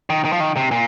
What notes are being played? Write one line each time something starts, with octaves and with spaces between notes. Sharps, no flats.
D#3
D#3
F3
D#3
C3
A#2